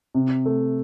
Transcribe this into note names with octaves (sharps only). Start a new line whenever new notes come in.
C3
A3